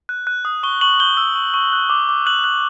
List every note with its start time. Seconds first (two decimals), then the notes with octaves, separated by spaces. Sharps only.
0.09 F#6
0.27 F#6
0.45 D#6
0.63 C#6 G7
0.81 C#6 F#7
1.00 G6 G7
1.17 E6
1.35 C#6
1.54 C#6
1.73 F#6
1.90 D6
2.09 D6
2.26 F#6 F#7
2.44 F#6